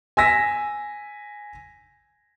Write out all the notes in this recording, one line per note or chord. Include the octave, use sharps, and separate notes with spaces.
G#5 E6 A#6 B6